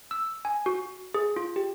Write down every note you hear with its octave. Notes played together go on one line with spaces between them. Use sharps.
E6
G#5
F#4
G#4
F4
G4